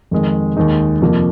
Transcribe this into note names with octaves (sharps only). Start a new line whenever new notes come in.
F2 D#3 G#3
D#2 D#3 G#3 D#4
F2 C3 F3 A#3